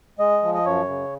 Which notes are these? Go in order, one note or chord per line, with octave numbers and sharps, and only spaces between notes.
G#3 D#5
F3
D#5
F#2 C#5
C#3